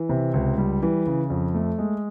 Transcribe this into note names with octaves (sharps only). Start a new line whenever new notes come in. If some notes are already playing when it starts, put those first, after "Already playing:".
Already playing: E3
C3
C#2
G3
E3
C#3
F2
A3
G#3